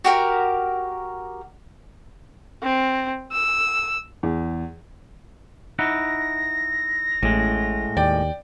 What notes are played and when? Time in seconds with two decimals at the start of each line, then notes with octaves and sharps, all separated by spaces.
0.05 F#4 G4 A#4
2.63 C4
3.32 E6
4.23 E2
5.79 D#4 E4 F#5 A#6
7.23 A1 A2 G#3
7.97 D#2 D5 G5